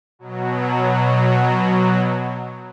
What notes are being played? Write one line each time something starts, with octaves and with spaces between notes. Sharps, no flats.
B2 F#3